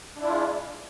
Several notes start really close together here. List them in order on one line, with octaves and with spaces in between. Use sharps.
D4 E4 F4 G#3